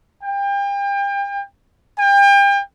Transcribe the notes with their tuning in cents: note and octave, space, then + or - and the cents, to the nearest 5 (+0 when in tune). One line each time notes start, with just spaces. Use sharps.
G5 +35
G5 +35